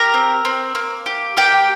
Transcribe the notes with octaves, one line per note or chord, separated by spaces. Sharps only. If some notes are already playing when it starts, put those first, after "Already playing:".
Already playing: G4 A#4 A#5
C4
C4
A#3
G4
A#3 G4 G5